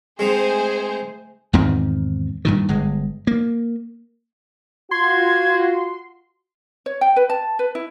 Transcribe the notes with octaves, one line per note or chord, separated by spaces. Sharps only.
G#3 A3 C4 D#4 G#4 C5
E2 G#2 D#3 C4
G2 A#2 D#3
G1 G#3
A#3
F4 F#4 C6 G#6
C#5
G5
B4
A5
B4
E4